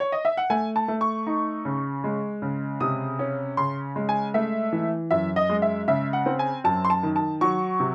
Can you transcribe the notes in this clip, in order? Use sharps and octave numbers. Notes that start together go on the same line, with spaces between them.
C#5
D#5
E5
F#5
A3 G#5
A5
A3
C#6
D#4
C#3
G#3
C#3
C3 D#6
C#4
C#3 C6
G#3
G#5
A3 E5
E3
F#2 E5
D#5
G#3
E5
C#3 E5
F#5
C4
G#5
F#2 A5
C6
A5
D#3
A5
F#3 C#6
C3